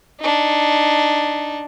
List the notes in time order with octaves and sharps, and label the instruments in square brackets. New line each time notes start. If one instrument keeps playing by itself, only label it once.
[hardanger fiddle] D4 D#4